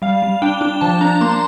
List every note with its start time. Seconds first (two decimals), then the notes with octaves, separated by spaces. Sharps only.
0.02 G3 F5
0.22 G3
0.42 D4 G5
0.61 D4
0.81 F3 A5
1.01 D4 A#5
1.21 A#3 C6